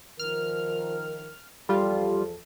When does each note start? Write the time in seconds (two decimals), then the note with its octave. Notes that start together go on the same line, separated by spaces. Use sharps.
0.19 D#3 F3 A#4 F6
1.69 E2 F3 G3 F4 A4